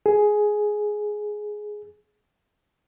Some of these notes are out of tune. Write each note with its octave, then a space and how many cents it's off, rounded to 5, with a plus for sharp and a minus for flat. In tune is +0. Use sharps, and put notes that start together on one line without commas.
G#4 +10